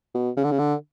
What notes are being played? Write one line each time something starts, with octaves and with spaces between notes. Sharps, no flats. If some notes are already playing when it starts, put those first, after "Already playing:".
B2
C#3
D3
C#3
D3